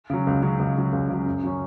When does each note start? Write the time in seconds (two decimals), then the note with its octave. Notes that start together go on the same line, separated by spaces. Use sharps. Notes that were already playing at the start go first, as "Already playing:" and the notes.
0.10 C#3 F#3
0.27 C#2
0.43 C#3 F#3
0.59 C#2
0.77 C#3 F#3
0.93 C#2
1.09 C#3 F#3
1.26 F#2
1.43 C#3 F#3 C#4